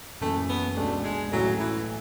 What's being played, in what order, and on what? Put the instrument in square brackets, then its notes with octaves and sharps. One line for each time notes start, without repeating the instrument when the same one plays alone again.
[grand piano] F#1 F#2 E3 [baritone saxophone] A3
[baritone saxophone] B3
[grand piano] C#2 B2 G#3 D4 [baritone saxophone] A3
[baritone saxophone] G#3
[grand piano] A1 A2 E3 A3 E4 [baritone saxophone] F#3
[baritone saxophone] E3